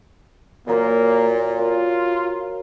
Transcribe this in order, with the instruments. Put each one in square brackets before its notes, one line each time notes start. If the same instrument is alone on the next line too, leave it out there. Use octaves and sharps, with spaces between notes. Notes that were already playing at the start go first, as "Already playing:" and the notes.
[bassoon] A#2 [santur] F#3 A#4 C5 [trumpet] A#3
[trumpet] F4 [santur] A#4